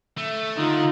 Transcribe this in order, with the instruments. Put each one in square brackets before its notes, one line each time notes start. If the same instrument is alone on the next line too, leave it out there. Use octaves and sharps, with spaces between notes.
[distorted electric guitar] A3
[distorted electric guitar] D3 [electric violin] D#4 F4